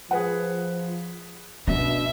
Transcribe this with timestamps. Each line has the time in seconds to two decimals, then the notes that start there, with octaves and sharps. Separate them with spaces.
0.11 F3 G#4 B4 F#5
1.68 B2 D4 E5